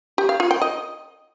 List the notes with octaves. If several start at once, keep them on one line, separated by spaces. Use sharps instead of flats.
G4
F5
F4
G5
D#5